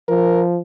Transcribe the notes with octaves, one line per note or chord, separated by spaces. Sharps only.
F3 A#4